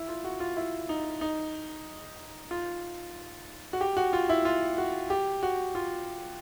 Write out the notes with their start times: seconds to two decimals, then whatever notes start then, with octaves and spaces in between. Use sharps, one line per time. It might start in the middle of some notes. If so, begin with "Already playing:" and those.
Already playing: E4
0.08 F4
0.24 F#4
0.40 F4
0.57 E4
0.89 D#4
1.21 D#4
2.51 F4
3.73 F#4
3.81 G4
3.97 F#4
4.13 F4
4.29 E4
4.45 F4
4.78 F#4
5.10 G4
5.43 F#4
5.75 F4